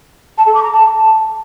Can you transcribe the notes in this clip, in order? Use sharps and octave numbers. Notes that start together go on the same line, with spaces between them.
A5
A4
D6
A#5
A5